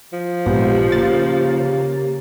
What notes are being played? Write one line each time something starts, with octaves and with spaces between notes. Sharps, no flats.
F3
A#1 G#2 B2 G4
C#3 A#3 A6